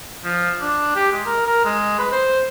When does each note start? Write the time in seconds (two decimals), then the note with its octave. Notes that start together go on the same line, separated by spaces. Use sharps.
0.24 F3
0.61 D4
0.95 G4
1.12 G#3
1.26 A#4
1.47 A#4
1.65 G#3
1.99 B4
2.12 C5